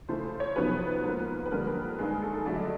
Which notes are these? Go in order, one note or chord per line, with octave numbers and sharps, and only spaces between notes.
C#3 E3 A3 C5
C5
C#5
F2 C3 D#3 F#3 B3 B4
G#2 F3 A#3
B4
F2 D3 G3 A#3 A#4
B4
A#4
G2 D#3 G#3 G#4
G#4
A4
A4
G2 D3 F#3 A3 D5
D#5